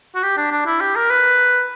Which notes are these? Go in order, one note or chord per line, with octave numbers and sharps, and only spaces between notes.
F#4
G4
D4
D4
E4
G4
A#4
B4